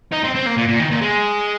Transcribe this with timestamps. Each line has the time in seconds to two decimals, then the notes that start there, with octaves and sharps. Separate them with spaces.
0.13 D#4
0.24 C4
0.36 C4
0.47 A#3
0.57 A#2
0.69 A#2
0.80 D#3
0.91 A#2
1.01 G#3